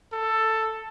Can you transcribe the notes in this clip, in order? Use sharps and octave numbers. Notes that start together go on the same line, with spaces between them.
A4